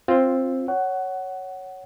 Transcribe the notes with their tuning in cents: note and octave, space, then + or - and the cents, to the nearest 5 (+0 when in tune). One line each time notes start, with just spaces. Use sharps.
C4 +10 F4 +0
C#5 +0 F#5 +15